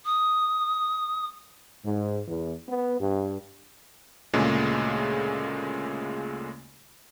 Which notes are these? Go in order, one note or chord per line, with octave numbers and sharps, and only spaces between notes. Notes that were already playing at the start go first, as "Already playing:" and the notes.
D#6
G#2
E2
B3
G2
D2 A#2 C#3 G#3 A3